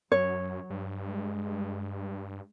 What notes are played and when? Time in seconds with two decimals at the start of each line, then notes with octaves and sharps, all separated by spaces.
0.12 F#2 F#3 C#5
0.70 G2
1.02 G#3